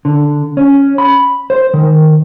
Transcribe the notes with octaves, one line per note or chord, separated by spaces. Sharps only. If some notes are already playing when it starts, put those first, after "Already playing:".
D3
C#4
B5
C5
D#3